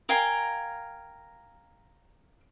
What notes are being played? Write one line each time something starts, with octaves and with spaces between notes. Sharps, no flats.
A#4 F5 G5 G#5